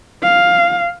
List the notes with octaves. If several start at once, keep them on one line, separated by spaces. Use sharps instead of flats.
F5